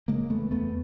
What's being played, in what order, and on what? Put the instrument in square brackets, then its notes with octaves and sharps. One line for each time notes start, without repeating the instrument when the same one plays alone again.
[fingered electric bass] C#3 G#3 A#3
E2 A3 B3
E2 A3 B3